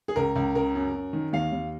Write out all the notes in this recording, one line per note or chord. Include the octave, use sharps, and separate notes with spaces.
G#4
C#2 A#4
C#2
C#3 A#4
F#2
F#2
D#3
D#2 F5
D#2